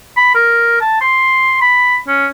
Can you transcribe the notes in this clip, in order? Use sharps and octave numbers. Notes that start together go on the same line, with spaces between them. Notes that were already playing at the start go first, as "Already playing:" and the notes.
B5
A#4
A5
C6
B5
C#4